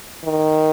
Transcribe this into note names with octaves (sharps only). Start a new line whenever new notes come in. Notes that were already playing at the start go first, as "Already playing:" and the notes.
D#3